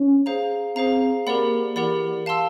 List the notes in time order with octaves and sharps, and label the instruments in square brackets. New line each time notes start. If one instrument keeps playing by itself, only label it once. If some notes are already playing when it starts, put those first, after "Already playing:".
Already playing: [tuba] C#4
[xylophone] G#4 C5 F5 A#5
[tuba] C4 [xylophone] G#4 C5 F5 A#5
[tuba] A#3 [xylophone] G4 A#4 D5 F#5 B5
[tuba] E3 [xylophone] G4 A#4 D5 F#5 B5
[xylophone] F5 A5 C6 E6